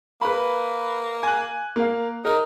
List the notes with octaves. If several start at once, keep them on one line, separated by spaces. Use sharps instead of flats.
A#3 B4 B5
G#5 F#6
A#3 F5
D#4 A#4